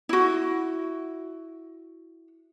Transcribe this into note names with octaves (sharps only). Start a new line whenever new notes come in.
E4 F#4